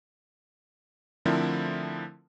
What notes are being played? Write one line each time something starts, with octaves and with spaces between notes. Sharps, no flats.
D3 F3 A3 C4 E4 A#4